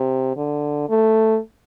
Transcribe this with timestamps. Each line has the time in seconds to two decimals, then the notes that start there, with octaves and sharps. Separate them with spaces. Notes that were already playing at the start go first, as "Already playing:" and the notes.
Already playing: C3
0.37 D3
0.89 A3